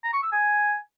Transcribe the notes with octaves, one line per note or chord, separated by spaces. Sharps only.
A#5
C#6
E6
G#5